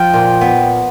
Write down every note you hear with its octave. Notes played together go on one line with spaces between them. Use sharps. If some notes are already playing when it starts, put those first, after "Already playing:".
Already playing: F3 G5
A#2
B3